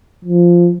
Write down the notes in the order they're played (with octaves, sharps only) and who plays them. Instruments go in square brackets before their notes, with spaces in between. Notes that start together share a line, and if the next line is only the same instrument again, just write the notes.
[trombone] F3